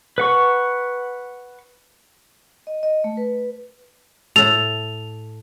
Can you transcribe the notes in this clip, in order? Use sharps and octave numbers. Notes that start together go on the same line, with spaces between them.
B4 F#5 C#6
D#5
D#5
A3
B4
A2 A4 F7